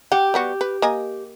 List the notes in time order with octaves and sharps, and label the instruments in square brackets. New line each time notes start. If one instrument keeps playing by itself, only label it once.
[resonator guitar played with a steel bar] G4 [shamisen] F#5
[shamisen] G3 B3 F#4
B4
A#3 D#5 G#5